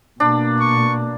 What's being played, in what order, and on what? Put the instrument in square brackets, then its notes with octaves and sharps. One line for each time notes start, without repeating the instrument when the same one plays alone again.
[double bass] B2 A#3 [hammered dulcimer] D4
[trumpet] C#6